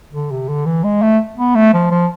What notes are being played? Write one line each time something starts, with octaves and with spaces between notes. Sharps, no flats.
D3
C3
D3
E3
G#3
A3
B3
A3
F3
F3